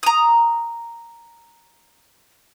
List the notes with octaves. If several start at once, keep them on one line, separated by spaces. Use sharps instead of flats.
A#5 D#6